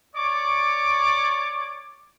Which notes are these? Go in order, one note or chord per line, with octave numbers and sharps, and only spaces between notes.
C#5 D5 C#6 D6